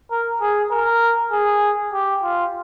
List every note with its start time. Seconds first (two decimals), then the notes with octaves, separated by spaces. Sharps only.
0.11 A#4
0.41 G#4
0.71 A#4
1.31 G#4
1.94 G4
2.23 F4